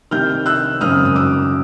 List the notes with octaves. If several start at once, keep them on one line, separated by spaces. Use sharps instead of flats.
C2 C3 D#3 G3 F6 G6
E6 F#6
G#1 F#2 C#3 F#3 D#6 F6
D#6
D6 E6